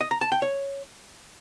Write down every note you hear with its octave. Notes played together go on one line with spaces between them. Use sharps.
D#5
A#5
A5
G5
C#5